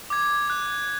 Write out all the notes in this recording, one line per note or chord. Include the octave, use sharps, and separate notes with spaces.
D6 G#6
F#6